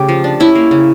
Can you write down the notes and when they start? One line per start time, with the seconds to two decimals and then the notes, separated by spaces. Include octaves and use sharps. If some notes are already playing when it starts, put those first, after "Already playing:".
Already playing: C#3 A3 G4
0.09 F3
0.24 D4
0.40 C#4 E4
0.55 A#3
0.71 C#3